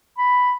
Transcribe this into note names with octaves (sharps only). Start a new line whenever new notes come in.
B5